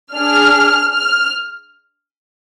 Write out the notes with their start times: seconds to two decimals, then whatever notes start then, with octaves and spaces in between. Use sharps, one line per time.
0.14 D4 G#4 F6
0.92 F6